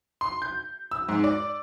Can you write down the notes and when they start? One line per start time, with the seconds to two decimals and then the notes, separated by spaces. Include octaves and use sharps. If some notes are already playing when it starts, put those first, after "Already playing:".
0.21 C6
0.42 G6
0.91 E6
1.08 G#2
1.24 D5